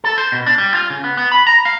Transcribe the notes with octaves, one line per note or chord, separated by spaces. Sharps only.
A4
C5
B2
D4
G3
F4
C#3
B3
B3
B5
A#5
F5